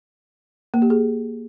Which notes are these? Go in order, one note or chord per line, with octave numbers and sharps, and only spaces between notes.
A#3
G4
G#4